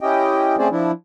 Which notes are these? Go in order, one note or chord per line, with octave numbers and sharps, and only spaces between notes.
C#4 E4 G4 D#5 G5
A3 C4 C#4 G#4 C5 D5
F3 D4 E4